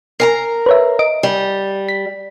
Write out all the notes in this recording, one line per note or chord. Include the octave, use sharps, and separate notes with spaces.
A#4 G#5 A#5 C7
B4 C#5 E5
D#5 D7
G3
B6